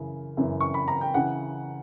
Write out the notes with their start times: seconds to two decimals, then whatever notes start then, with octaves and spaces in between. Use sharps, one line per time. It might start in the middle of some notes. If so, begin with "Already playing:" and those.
Already playing: F#2 C#3 E3
0.37 F#2 C#3 E3
0.61 C#6
0.74 B5
0.88 A#5
1.01 G5
1.14 C#3 E3 F#5